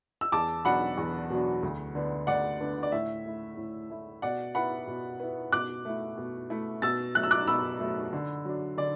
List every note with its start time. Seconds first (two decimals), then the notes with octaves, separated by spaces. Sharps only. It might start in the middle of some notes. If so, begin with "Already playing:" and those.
0.21 E6
0.32 E2 A5 D6
0.65 B2 F#3 D4 F#5 B5
0.97 E2
1.30 B2 F#3 D4
1.63 D2
1.95 D3 B3 D4
2.27 D2 D5 F#5
2.60 D3 B3 D4
2.83 D5
2.92 A2 E5
3.25 A3 E4
3.57 A2
3.90 A3 E4
4.22 B2 D5 F#5
4.55 B3 E4 F#5 B5
4.87 B2
5.20 B3 E4
5.52 B2 D6 F#6
5.85 A3 E4
6.18 B2
6.50 A3 E4
6.82 B2 E6 A6
7.15 F#3 A3 F#6
7.23 E6
7.31 D6 F#6
7.47 B2 B5 E6
7.80 F#3 A3
8.13 D3
8.45 F#3 D4
8.77 D3 D5